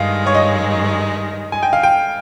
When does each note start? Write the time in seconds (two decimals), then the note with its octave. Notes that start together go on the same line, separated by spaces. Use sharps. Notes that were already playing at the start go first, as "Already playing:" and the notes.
Already playing: G2 D#3 G#3 F5
0.26 C#5
0.35 D#5
1.52 G#5
1.63 G5
1.73 F5
1.83 G5